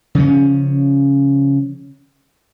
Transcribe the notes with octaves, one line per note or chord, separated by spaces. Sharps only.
C#3 F3 C#4